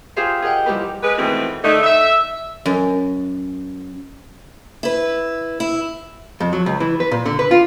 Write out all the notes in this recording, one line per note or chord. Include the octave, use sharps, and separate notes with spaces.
F4 G4 G#4 C5 E5 F5
G#4 A#4 D#5 F#5 G5
F3 G3 E4 G4 A#4 B4
G#3 B4
B2 D#3 E3 G#3 A3 C4
D3 A3 D#4
E5
F#2
E4 B4
E4
F2
F#3
C#2
E3
B4
A#2
D3
B4
F4